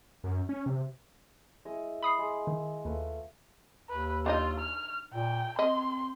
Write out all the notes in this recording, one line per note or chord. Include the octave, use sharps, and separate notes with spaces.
F#2
C#4
C3
G#3 E4 D#5
B5 D#6 C7
G#3
D#3
D#2 A3 F4 B4
D#2 B4
D4 D#4 F4 D#5
F6
A#2 G5
C4 D#5 C6